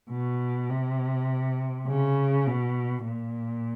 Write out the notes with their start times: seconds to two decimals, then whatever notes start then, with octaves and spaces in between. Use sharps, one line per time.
0.10 B2
0.69 C3
1.87 C#3
2.47 B2
3.05 A#2